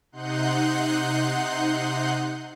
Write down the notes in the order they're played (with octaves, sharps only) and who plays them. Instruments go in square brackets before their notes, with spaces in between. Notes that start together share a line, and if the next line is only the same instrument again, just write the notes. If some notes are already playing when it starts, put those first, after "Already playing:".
[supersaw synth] C3 D#4 F#5 C6 F#6 G6